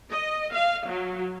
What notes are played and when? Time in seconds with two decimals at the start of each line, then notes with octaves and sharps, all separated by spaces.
0.12 D#5
0.53 F5
0.88 F#3